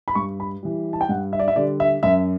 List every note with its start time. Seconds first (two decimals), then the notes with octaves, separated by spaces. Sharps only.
0.08 B5
0.15 G2 C#6
0.40 B5
0.63 E3 G3
0.93 A5
1.01 G5
1.09 G2 F#5
1.33 E5
1.40 D5
1.48 E5
1.56 D3 G3 D5
1.80 E5
2.03 F#2 E5